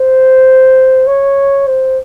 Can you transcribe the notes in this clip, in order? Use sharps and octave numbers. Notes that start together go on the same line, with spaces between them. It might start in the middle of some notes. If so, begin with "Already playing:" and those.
Already playing: C5
C#5
C5